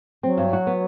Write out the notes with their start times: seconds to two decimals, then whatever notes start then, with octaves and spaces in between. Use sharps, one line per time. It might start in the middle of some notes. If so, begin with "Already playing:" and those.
0.23 F#3 C4
0.37 G2
0.53 F#4
0.67 B3